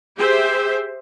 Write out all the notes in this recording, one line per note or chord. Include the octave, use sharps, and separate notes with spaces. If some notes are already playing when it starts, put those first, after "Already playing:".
G4 G#4 C5 E5